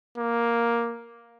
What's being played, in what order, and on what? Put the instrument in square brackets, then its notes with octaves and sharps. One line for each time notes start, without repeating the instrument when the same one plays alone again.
[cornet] A#3